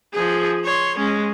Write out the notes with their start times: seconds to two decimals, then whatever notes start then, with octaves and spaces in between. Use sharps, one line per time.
0.13 F3 G#4
0.64 C#5 C6
0.97 G#3 C#4